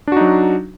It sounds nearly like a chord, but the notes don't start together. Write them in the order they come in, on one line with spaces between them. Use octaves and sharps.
D4 F#4 D#4 F#3